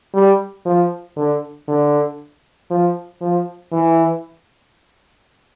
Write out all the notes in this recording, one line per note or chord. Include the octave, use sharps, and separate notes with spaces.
G3
F3
D3
D3
F3
F3
E3